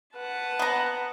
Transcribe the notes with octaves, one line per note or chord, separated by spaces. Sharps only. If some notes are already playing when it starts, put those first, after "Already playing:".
B4 F#5 A5
B3 A#5